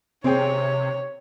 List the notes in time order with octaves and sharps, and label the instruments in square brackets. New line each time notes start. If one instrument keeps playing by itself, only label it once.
[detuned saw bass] C3 [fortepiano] C4 G#4 G5 [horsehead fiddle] C#5